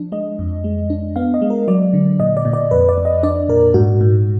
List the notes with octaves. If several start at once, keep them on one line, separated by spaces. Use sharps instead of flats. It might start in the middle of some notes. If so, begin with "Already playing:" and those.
Already playing: F3 D4
G#3 D#5
F2
G#3
D4
B3 F5
D#5
G#3
A#4
F#3 D5
D3
A#2 D#5
D5
A#2
D5
F2 B4
D5
F2
D#5
D4 D5
A#2 A#4
G#2 F#4
G#2